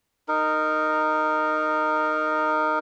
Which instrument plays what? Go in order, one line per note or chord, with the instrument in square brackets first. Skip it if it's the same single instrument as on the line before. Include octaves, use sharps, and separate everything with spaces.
[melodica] D#4 A#4